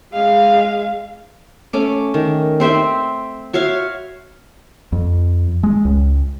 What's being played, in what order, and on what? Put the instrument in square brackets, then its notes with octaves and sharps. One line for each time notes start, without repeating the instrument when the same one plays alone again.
[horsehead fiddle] G#3 F5
[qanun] A3 C#4 D6
D#3
C4 C5 E5 G5
F#4 C#5 E5 F5
[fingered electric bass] F2
G#3
C#2